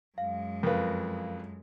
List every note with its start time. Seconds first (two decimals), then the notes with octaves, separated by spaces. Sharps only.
0.18 F#2 G#3 F5
0.63 F2 A#4 B4 F5